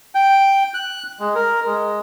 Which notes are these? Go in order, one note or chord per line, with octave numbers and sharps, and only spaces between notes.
G5
F#6
G#3
A#4
G#3